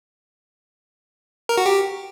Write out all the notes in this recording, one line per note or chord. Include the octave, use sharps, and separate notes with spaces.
A#4
F#4
G4